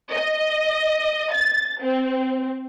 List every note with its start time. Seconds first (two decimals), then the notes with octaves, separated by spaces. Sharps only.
0.12 D#5
1.33 A6
1.81 C4